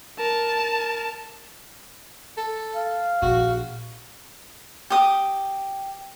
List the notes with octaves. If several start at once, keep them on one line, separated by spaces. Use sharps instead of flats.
A#4 A5
A4
F5
A#1 F#4
G4 D#6